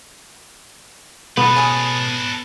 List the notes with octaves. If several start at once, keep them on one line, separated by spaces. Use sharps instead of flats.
B2 B3 A4 B4
C#4 G#4